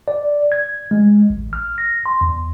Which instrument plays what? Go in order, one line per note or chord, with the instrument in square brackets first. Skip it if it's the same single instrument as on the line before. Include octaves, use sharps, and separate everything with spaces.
[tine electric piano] D5
G#6
G#3
A1
F6
A#6
C6
E2